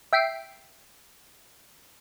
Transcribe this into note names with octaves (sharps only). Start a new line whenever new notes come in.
E5 G5 B6 C7 D7